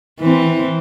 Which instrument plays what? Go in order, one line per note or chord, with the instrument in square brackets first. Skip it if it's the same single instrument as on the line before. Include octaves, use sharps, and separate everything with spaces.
[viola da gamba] E3 C4